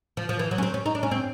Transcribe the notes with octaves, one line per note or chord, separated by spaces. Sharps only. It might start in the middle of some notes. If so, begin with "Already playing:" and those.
F3
F3
E3
F#3
C#4
C4
C#4
D#4
D4
C#4
C4